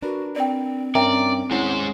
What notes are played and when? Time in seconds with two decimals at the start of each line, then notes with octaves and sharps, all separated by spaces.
0.02 D4 F#4 A#4 B4
0.36 C4 D5 G5
0.95 G2 C#4 A#4 D5 E5 G5 A#5
1.51 D#2 G#3 C#4 E4 C5 F#5